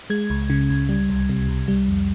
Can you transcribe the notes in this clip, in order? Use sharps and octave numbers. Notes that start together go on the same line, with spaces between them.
G#3 G#6
C#2
C#3
C#2
G3
C2
C3
C2
G3
F2